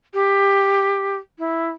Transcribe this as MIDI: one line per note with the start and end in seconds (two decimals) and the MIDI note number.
0.14 1.17 67
1.39 1.70 64